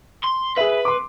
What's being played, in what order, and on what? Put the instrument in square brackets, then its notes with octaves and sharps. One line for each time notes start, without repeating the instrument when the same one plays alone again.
[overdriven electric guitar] C6
[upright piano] G#4 E5 [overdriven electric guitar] B4
[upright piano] C6 D6